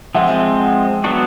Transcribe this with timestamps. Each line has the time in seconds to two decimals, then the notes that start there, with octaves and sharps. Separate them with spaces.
0.14 F3 G#3 C4 E5 F#5
1.04 F#3 B3 D4 F#4